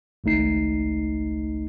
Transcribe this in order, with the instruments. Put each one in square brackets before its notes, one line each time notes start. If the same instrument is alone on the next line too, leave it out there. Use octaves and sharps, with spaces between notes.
[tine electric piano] G#1 C#2 A3 D#4 C7